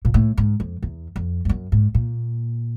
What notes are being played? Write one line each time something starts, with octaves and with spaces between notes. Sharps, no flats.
A#2
A2
G#2
F2
E2
F2
G2
F#2
G#2
A#2